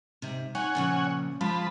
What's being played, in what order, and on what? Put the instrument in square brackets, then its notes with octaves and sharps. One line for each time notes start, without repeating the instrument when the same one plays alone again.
[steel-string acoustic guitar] G#2 C3
[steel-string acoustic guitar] D#4 F4 [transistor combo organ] C#5 F#5 G#5
[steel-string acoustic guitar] A#2 C#3 F3
[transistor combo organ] F3 A5 B5 [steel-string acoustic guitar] G#3